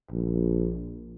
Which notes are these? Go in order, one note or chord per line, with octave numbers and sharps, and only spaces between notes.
A#1